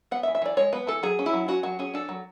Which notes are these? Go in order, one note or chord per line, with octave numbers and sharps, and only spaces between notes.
B3 F#5
E5
E3
E5
E3 D5
G#3 C#5
B3 B4
E3 A4
F#3 G#4
C#4
E4
F#3
C#4 F#4
F#3 F#4
C#4 G#4
D4 A4
F#3